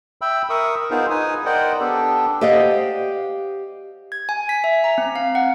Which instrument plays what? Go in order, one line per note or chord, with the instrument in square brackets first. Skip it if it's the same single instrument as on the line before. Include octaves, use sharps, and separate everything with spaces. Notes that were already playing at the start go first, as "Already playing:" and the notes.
[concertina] E5 G5 B5 E6
A#4 E5 C#6 D#6
B3 D#4 F4 G#4 A#4 C5
D#4 B4 G#5 D#6
A#4 C5 D5 D#5 F#5 G5
B3 D4 G4 A4
[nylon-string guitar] G4 C5 D5 D#5 F5 F#5
[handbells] G#6
G#5
B6
E5
A#5
C4
F5
F#5